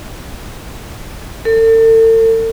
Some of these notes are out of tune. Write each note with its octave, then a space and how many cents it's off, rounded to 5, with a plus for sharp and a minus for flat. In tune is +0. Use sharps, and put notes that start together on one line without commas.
A4 +40